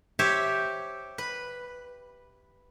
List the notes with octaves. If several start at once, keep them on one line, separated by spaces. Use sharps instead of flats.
G4 C5 C#5 E5
B4